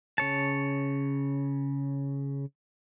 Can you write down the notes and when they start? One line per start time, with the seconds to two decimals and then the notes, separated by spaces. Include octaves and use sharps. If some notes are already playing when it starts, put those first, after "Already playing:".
0.18 C#3 C#5 A5